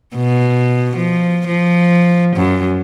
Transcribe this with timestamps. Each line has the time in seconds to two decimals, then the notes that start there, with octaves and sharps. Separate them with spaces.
0.16 B2
0.97 F3
1.47 F3
2.36 F#2